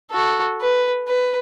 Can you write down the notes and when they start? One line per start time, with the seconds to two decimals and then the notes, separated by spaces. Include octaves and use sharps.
0.11 F#4 A4
0.61 B4
1.07 B4